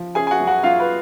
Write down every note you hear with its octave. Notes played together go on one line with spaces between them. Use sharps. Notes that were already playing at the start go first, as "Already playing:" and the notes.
Already playing: F3
C#4 G#4 G#5
G#5
F#4 F#5
F#3
F#4 F#5
F#3 F4 F5
B4